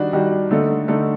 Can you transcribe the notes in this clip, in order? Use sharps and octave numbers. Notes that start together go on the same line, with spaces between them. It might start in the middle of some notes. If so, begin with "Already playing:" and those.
Already playing: D#3 G3 D4 F#4
D#3 G3 D4 F#4
D3 A3 D#4 A4
D3 A3 D#4 A4